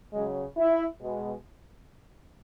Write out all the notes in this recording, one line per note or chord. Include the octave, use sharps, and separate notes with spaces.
C#3 F#3 G#3
E4
B2 G#3